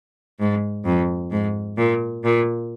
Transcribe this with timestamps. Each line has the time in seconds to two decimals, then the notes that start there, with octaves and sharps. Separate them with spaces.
0.39 G#2
0.85 F2
1.31 G#2
1.77 A#2
2.24 A#2